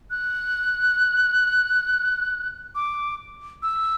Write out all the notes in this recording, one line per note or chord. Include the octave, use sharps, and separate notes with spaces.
F#6
D6
E6